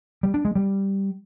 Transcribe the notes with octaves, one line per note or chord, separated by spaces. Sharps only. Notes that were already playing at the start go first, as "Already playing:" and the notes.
G3
D4
G#3
G3